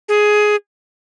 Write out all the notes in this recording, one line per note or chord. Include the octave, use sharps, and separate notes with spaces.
G#4